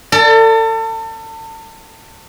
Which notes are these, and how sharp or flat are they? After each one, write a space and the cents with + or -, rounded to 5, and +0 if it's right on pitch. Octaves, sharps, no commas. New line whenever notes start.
A4 +35 D5 +0